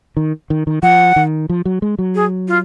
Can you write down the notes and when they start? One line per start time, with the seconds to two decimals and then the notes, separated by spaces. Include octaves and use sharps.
0.17 D#3
0.50 D#3
0.67 D#3
0.83 F3 F#5
1.16 D#3
1.49 F3
1.65 F#3
1.82 G#3
1.99 F#3
2.15 G#4
2.48 F4